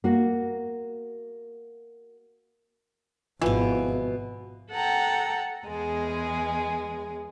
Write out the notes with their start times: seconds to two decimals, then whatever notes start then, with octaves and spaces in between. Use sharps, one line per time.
0.04 A#3 F#4
3.41 G#1 B2 E3 F3
4.71 A4 F#5 G5 A#5
5.65 E2 G#3 G#4